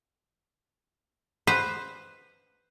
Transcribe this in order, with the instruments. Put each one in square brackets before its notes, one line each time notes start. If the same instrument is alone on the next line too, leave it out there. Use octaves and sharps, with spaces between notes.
[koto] B4 C5